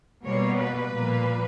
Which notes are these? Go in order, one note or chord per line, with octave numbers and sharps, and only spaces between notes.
B2 G3 A#3 C#5
B4
A#2 F3 A#3